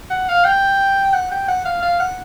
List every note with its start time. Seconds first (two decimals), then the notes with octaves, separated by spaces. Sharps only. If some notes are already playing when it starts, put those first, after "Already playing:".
0.10 F#5
0.29 F5
0.45 G5
1.14 F#5
1.31 G5
1.48 F#5
1.65 F5
1.83 F5
2.00 F#5